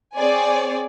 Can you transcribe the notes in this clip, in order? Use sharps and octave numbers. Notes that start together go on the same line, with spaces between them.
C4 G#4 C#5 D5 G#5